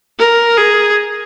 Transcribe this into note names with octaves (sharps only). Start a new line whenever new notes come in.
A#4
G#4